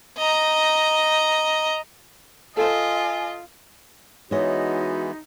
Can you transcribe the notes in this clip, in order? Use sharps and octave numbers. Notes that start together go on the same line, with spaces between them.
D#5 A#5
F4 A4 C5 D#5 G#5
E3 G#3 B3 D#4 F#4 C#5 D#5